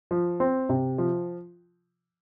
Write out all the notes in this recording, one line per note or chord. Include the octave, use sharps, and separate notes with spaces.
F3
C4
C3
F3